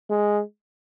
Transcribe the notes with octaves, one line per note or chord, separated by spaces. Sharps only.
G#3